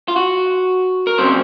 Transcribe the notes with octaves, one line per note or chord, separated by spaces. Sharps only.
F4
F#4
A#4
C#3 F#3 C4 C#4 C5